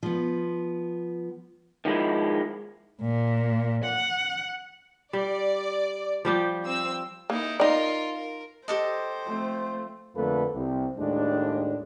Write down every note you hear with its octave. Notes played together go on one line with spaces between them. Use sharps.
F3 B3
D#3 F3 G#3 E4
A#2
F#5
G3 D5
F3 G3 G4
C4 E6
A#3 D#4 E4
D#4 F4 A#4 D5
A#4
G4 A4 C5 D#5
F3 A3 C4
F2 D3 A3 A#3 A4 B4
C2 C3
D#2 A2 G#3 D4